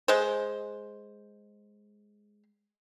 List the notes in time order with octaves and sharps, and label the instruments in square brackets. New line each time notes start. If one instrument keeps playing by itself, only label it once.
[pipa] G#3 C5